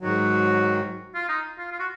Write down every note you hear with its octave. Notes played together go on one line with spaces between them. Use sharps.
G#2 D#3 F#3 F#4
F4
D#4
F4
F4
F#4